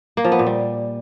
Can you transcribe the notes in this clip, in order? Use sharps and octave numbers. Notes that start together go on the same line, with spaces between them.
A#3
F3
B3
A#2
G3